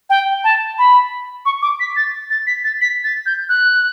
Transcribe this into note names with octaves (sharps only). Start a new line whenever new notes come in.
G5
A5
B5
C#6
D6
B6
A6
A6
B6
A6
B6
A6
G6
F#6